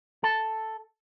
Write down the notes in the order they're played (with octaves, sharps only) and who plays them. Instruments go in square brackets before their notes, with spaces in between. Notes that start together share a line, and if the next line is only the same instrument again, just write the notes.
[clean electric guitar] A4